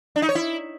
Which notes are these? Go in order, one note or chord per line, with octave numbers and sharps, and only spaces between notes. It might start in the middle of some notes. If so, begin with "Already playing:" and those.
D4
D#4
C#5
E4